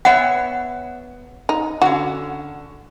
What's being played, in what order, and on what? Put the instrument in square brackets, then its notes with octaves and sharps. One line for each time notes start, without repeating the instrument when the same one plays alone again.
[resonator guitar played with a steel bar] B3 C#5 E5 [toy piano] F#5
[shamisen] D#4
[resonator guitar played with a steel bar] D3 C#4 [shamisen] F#4